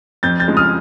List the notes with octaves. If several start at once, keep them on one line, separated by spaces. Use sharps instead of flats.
F2 G6 A6
G6 A6
C#3 F3 G#3
D#6 F6